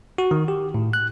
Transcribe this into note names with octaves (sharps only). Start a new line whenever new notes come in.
F#4
D#3
G4
A2
F#6